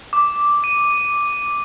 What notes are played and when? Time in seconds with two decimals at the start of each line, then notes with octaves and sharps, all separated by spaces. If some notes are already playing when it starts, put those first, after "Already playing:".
0.13 D6
0.64 D#7